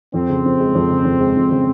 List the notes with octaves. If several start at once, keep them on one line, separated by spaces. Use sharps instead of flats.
F2 C4
C#3
F2
G#3
F2
C#3
F2
G#3
F2
C#3